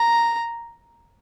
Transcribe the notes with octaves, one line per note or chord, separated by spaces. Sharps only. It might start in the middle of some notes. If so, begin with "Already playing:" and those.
Already playing: A#5